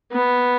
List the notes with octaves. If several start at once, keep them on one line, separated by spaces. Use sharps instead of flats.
B3